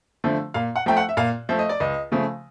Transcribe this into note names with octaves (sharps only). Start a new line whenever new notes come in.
D3 F3 A3
A#2 F5
F#5
F3 A3 G5
F#5
E5
A#2 F5
F3 A3 E5
D#5
D5
C#2 D#5
C#3 F3 A3